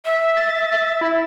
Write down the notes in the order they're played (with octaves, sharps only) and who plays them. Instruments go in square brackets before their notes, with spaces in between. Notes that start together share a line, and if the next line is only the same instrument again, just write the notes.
[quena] E5
[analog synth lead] A6
E4